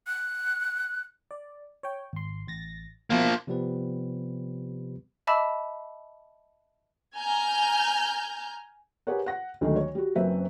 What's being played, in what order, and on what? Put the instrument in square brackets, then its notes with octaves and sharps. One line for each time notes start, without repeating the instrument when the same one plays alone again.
[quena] F#6
[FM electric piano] D5
C#5 G5
G#1 C6
A1 A6 A#6
[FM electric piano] B2 E4 [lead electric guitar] F3 A#3
[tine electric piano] C3 F3 G3 B3 C4 B4
[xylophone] D#5 E5 A5 B5 D6 E6
[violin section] G#5 A#5 F6 G6
[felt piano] G4 G#4 A#4 B4 C#5 F#5
F#5 A#6
D2 D#3 F#3 G#3 A3
C#5
G3 F#4
F#1 F#2 C4 B4 E5